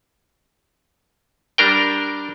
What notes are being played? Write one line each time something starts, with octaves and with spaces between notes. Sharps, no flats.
G3 D4 A#4 G5